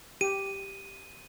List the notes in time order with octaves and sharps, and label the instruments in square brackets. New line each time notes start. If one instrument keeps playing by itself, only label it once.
[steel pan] G4 [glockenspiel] D#7